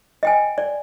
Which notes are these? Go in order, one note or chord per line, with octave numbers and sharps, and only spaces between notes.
D#5 G5 G#5
D5